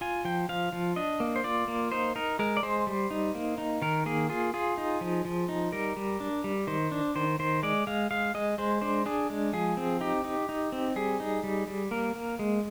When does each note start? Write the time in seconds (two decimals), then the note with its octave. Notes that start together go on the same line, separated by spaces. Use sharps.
0.01 F4 G#5
0.25 F3 G5
0.49 F3 F5
0.73 F3
0.96 D4 D#5
1.20 A#3
1.36 C5
1.44 F4 D5
1.68 A#3
1.92 D#4 C5
2.16 D#4 A#4
2.39 G#3 A#4
2.57 D5
2.63 G#3 C5
2.87 G3
3.11 D#4
3.35 A#3
3.58 D#4
3.82 D#3 A#4
4.06 A#3 G#4
4.29 F4 G#4
4.54 F4 G#4
4.78 D#4
5.01 F3
5.25 F3
5.49 D#4
5.72 G3 A#4
5.97 G3
6.20 D4
6.44 G3
6.67 D#3 C5
6.92 D4
7.15 D#3 C5
7.39 D#3 C5
7.63 G#3 D5
7.87 G#3 F5
8.11 G#3 F5
8.34 G#3 D#5
8.58 G#3 C5
8.81 D4 C5
9.06 D4 G#4
9.30 G#3
9.53 F3 G#4
9.77 C4
10.01 D#4 G4
10.25 D#4
10.49 D#4
10.72 C4
10.96 G3 G#4
11.20 D#4
11.44 G3
11.68 G3
11.91 A#3 A#4
12.16 A#3
12.39 G#3